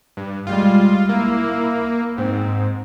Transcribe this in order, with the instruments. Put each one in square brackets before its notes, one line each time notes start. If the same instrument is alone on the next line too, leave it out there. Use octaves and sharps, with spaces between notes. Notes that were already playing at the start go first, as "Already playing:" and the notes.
[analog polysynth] G2
[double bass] G3 G#3 [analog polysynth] F4
[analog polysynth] A#3 [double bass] E4
[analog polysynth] G#2 [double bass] C4